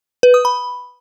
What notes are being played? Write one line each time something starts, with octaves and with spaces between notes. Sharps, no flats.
B4
D#6
B5